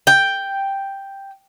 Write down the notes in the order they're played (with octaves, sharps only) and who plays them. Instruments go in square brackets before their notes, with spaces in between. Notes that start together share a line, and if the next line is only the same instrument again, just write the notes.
[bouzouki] G5